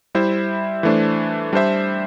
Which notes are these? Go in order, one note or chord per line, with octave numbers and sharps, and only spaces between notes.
G3 E4 C5 E5
E3 A3 D4 C5
G3 D4 C5 E5